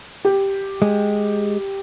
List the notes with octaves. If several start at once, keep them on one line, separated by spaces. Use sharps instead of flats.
G4
G#3